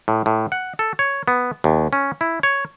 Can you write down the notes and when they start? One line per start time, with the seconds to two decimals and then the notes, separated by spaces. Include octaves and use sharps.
0.08 A2
0.26 A2
0.52 F#5
0.79 A4
0.99 C#5
1.28 B3
1.64 D#2
1.93 C#4
2.21 E4
2.43 C#5